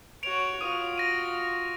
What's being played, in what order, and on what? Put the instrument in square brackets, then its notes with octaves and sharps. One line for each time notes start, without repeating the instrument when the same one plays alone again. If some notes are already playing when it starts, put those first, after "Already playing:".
[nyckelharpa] F#4 C#5 [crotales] D7 F7
[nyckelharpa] F4 F#4 [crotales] D#6 D#7
[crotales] A#6 D#7